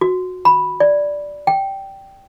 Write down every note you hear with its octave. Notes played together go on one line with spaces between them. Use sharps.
F#4
B5
D5
G5